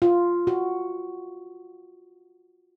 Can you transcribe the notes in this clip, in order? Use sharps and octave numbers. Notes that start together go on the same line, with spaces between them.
F4
F#4